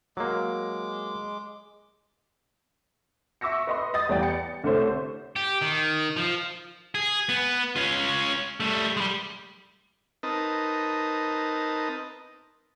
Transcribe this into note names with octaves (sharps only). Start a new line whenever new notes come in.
F#3 G#3 A#3 D6
E5 C#6 D6 E6 A#6 C#7
B4 D#5 C6
D#5 D#6 A6
E2 G3 D5 G5
C#7
C2 D3 A3 C5 C#5
G4
D#3
F3
G#4
B3
C#4 F4
G3 A3
G3 G#3
C4 D#4 A#4 B4 D#5 A5